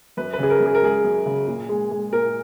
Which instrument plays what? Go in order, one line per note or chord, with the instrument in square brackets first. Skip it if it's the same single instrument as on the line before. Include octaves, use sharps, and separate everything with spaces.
[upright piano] F#2 B4
B4
C#3 G#4
A#4
F#2
G#4
A#4
G#3 G#4
F#2
C#3
A#2
G#3
G#3
A#2 A#4